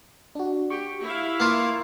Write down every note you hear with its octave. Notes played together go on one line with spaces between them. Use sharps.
D4 F#4
G4 C#6
E4 E5 F5
A#3 F4